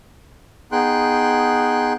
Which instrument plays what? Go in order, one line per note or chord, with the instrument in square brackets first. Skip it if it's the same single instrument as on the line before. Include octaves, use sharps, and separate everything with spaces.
[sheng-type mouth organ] B3 D#4 G#4 G5 C6 F#6